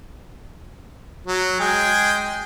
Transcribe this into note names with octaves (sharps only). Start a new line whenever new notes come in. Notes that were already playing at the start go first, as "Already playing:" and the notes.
F#3
G#3 G#4 G5